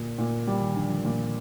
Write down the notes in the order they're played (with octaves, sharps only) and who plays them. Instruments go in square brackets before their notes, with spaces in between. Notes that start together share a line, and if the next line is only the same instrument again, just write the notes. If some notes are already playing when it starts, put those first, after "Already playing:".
Already playing: [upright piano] A#2 [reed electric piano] D3
[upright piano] A#2
[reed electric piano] D3 [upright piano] G3
[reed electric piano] D#3
[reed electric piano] D3 F3 [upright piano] D4
[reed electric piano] D3 F3
[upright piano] A#2